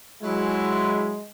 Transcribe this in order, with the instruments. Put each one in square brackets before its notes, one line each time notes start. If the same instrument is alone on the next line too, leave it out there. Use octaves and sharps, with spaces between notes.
[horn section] F#3 E4 [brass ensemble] G#3